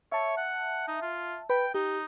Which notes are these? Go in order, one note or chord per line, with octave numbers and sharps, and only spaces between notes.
C#5 E5 A5
F#5
D#4
F4
B4 G5 B5
D#4 G4